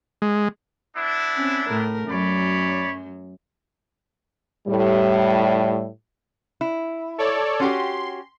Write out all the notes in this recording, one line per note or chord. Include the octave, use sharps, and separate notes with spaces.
G#3
B3 D4 E4
C4 C#4
A2 A3 A#4
F#2 F#3 C#5 D5 B5
A2 G3
E4
A4 C#5 D5
C#4 F#4 G4 C6